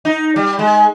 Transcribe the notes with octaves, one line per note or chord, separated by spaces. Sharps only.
D#4
G3
G#3